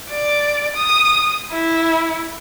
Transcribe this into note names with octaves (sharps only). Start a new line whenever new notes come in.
D5
D#6
E4